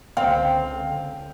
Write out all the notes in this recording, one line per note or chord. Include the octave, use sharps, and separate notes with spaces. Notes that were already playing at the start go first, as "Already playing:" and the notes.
C#2 D3 C4 F5 G5